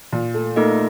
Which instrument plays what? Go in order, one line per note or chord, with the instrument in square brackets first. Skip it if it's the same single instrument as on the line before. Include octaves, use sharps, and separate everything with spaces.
[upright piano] A#2
A3
[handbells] A3 D#4 A4 D#5 [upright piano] A#3